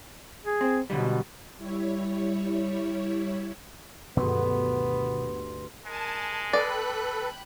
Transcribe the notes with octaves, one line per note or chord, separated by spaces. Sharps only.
G#4
C4
B2 D3 F#3 G3
G3 E4 C#5
D2 G2 B2 D#3 F#3 B3 B4 C6
G#3 A#4 G#5 A5
A4 B4 D5 G5 B5 F#6